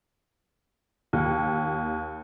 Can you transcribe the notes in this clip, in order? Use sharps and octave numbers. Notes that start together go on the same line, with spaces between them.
D#2